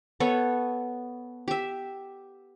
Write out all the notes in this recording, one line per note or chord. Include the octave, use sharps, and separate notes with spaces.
B3 A4 C#5
G4 E5